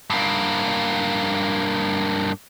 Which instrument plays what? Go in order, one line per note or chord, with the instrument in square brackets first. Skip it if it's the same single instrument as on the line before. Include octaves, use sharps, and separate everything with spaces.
[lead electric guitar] G2 A#3